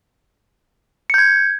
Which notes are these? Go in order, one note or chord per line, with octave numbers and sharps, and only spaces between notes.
G6 G#6 C#7